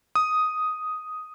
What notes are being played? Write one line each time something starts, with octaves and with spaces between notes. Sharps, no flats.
D#6